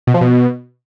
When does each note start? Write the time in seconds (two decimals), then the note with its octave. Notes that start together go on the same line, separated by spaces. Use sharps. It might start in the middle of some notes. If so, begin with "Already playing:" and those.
0.07 B2
0.14 F3
0.21 B2